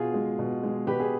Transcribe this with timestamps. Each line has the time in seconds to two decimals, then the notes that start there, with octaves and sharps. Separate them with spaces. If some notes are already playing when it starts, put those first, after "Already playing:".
Already playing: B2 F4 G#4
0.14 G#3
0.39 B2
0.63 G#3
0.87 B2 G4 B4
1.00 G#4